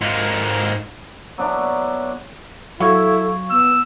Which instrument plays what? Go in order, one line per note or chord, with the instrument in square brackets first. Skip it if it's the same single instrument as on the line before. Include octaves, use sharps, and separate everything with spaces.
[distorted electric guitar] G#2 A#3
[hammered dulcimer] F#3 B3 D4 E4
[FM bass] F#3 [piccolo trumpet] E4 [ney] A4 [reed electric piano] F5 C#6 G#6
[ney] B3 [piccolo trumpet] E6